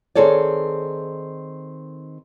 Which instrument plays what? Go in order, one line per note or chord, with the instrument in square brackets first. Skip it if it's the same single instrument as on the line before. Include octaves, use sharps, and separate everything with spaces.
[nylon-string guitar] D#3 C4 G#4 A4 C#5 D5